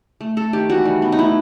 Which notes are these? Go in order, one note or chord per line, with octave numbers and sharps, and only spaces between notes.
A3
A3 A4
D#3 G4
E3 F#4
G3
B3
D#4
A3 E4